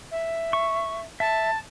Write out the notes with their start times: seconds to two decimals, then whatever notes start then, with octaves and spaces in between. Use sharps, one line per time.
0.11 E5
0.53 C#6
1.20 E5 A5